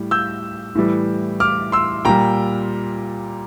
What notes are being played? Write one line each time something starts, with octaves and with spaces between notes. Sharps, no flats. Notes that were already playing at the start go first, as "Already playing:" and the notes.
Already playing: A2 G3
E6 G6
A2 E3 G3
D6 F6
C6 E6
A#2 G3 G5 A#5